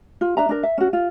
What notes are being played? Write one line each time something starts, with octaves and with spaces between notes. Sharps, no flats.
F4
D4 E5 A#5
D4 A#4
E5
C#4 F#4
F4